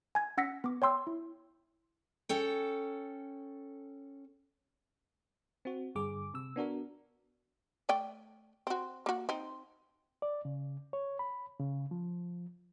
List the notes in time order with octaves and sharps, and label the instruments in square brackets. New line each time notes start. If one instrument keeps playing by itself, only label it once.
[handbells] G#5 G#6
C#4 F#5 E6 A#6 B6 C#7
B3 D6
C#5 G5 C6 E6
E4
[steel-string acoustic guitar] C#4 A4 G5
[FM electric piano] C4 F#4
G2 D3 G#4 D6
C3 E6
B3 D4 F#4 A#4
[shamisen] A3 D5 G5
C4 F#4
A#3 F#4
C4 D#4
[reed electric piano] D5
C#3
C#5
B5
C#3
F3